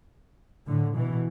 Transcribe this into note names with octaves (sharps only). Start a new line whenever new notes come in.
A2 D3
B2 E3